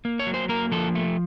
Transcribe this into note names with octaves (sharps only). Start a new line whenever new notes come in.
A#3
C#5
F#3
C5
A#3 A#4
F3 A4
A3